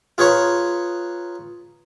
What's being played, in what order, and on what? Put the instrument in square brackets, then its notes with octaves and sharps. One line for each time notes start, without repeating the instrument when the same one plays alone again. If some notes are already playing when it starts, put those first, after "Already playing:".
[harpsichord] F4 G#4 B4 C#5 A#5